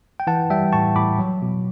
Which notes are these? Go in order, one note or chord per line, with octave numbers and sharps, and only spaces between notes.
G5
E3 F#5 A5
G3 E5 G5
A2 A5 C#6
A2 B5 D6
F#3
B2